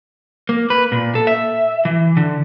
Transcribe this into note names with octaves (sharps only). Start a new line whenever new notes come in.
A#3
B4
A#2
A4
E5
E3
D3